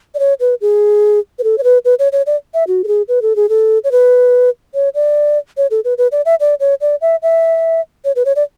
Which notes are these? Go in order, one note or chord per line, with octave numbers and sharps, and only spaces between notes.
D5
C#5
B4
G#4
B4
A4
C#5
B4
B4
C#5
C#5
D5
E5
F#4
A4
G#4
B4
A4
G#4
A4
C#5
B4
C#5
D5
C#5
A4
B4
B4
D5
E5
D5
C#5
D5
E5
E5
C#5
B4
C#5
D5